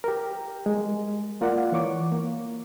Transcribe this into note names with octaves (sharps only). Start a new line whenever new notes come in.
G4 A#4
G#3
A#3 F4 A#4 D5 F#5
E3 C#5 C#6 D6
A#3